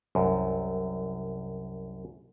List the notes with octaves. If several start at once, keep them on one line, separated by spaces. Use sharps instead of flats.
C2 F#2